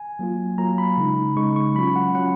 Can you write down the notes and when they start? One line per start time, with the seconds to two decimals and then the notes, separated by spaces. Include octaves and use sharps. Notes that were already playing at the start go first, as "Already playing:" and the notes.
Already playing: G#5
0.19 F#3 A#3 F4
0.58 F#3 A#3 F4 A#5
0.78 B5
0.97 C#3 G#3 D#4
1.37 C#3 G#3 D#4 C#6
1.56 C#6
1.75 F#3 C#4 F4 B5
1.96 F#5
2.15 F#3 C#4 F4 F#5